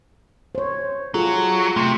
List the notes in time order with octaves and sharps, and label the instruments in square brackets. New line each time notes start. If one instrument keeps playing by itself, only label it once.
[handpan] C5 C#5
[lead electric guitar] F#3 [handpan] F4 G#4 A4
[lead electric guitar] C3 [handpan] A3